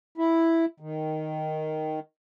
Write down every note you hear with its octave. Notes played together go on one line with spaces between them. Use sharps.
E4
D#3